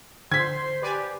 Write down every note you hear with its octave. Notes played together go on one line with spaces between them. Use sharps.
D3 C5 C6 G#6 B6
G4 B4 D5 G#5